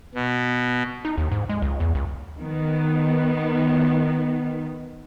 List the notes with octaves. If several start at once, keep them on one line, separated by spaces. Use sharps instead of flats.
B2
D#4
D#2
G#2
G#3
C#2
E2
C#2
D#3 B3